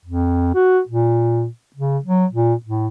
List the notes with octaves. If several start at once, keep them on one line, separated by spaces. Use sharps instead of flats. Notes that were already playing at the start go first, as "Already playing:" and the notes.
F2
F#4
A#2
C#3
F#3
A#2
A2